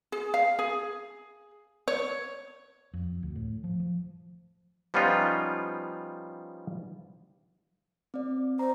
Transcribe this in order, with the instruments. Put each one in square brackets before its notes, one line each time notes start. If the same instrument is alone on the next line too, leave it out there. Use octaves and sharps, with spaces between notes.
[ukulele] G#4
F5
G#4
C#5
[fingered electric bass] F2
D2
A2
F3
F3
[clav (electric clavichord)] F3 G3 B3 C#4 D#4 F4
[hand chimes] C4 D5
[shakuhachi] C5 [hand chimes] A#5